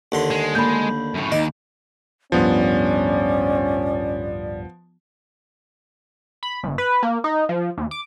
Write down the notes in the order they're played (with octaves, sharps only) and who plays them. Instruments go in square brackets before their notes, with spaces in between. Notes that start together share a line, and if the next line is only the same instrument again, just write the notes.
[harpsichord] D#2 D3 C6
[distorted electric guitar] G#3
[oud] A#3 D4 [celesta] B5 G6
[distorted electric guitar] F#2 A2
[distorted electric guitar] D#2 [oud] D#4 [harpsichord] D5
[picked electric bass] D1 G2 [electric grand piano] F3 B3 [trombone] C#4 [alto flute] D5
[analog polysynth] B5
G1
B4
A#3
D#4
F3
D#2
D6